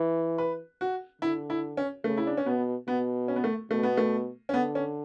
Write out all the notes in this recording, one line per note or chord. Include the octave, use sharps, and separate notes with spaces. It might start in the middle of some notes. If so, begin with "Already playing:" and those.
Already playing: E3
B4
F#4
D3 E4
E4
C#4
C#3 A3
E4
D4
C#4
B2 B3
B2 B3
C#4
B3
A3
B2 A3
B3
A3
C#4
D3 B3
C#4